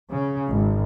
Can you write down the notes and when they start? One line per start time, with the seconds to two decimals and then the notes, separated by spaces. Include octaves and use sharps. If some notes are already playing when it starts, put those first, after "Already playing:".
0.10 C#3
0.50 G#1